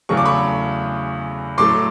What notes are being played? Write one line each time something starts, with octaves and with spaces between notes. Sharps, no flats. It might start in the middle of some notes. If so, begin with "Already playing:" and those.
E2 C#3 F#3 A3 C#6
D6
B5 C#6
A2 F#3 A3 C6 D6